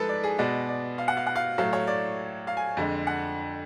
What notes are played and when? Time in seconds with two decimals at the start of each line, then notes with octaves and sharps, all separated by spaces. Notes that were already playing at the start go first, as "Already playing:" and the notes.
Already playing: G#2 F3 A4 B4
0.09 D5
0.24 G#4
0.38 B2 G#3 B3 D5
0.68 D5
0.98 F5
1.08 F#5
1.17 F5
1.26 F#5
1.36 F5
1.58 A2 F#3 A3 F5
1.73 C#5
1.87 D5
2.47 F5
2.57 G#5
2.77 F2 D3 G#3
3.07 F#5